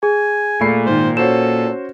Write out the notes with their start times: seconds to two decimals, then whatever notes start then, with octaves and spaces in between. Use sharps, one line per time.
0.03 G#4 G#5
0.61 A#2 A3 B5 C7
0.86 G#2 D#3 C5
1.17 C#4 F#4 A4 C5 E7